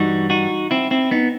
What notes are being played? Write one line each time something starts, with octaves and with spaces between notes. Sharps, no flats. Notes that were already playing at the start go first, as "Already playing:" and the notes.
Already playing: G2 E3 G3 D#4 F#4
D#4 F#4
C4 E4
C4 E4
B3 D#4